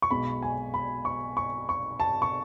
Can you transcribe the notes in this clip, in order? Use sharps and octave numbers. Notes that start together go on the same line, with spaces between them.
C#6
B1 B2 G#3 B5
G#5
B5
C#6
C#6
C#6
A5
C#6